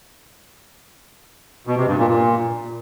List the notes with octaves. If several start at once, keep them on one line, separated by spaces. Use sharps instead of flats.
B2
C3
G2
A#2
A#2